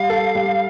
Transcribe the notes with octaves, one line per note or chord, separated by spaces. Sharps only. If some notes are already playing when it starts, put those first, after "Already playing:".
Already playing: G3 F5
A4
G3